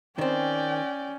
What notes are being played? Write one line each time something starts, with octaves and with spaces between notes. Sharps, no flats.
D#3 C4 C#4 D5 G5